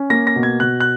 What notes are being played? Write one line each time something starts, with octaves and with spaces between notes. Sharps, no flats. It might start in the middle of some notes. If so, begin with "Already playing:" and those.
Already playing: C#4
A#3 A#6
A#6
B2
G#6
B2 F#6
F#6